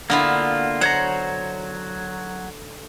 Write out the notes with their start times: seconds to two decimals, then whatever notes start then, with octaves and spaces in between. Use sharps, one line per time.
0.10 D3 A#3 B3 E4 F4
0.81 F#3 C5 C#5 F#5 A#5